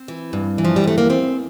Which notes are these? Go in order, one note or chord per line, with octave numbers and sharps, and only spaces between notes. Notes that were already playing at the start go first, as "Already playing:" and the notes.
Already playing: C4
E3
G2
E3
F3
G3
G2 A3
A#3
E2 C4